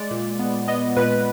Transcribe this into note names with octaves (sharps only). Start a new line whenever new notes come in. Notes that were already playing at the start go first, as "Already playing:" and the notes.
Already playing: G#3 D5
A#2
B3
B3 D#5
A#2 B4